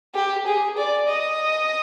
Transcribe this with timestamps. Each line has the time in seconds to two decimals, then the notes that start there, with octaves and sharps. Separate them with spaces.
0.15 G4
0.46 G#4
0.77 D5
1.09 D#5